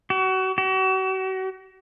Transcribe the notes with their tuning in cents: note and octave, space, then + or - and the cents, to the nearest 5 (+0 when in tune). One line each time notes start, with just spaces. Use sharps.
F#4 +30
F#4 +40